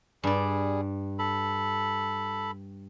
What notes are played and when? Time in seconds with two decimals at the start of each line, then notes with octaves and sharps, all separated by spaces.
0.23 G2 G3 G#4 D5
1.19 A4 B5